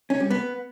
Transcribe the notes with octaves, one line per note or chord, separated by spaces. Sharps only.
C#4
G3
B3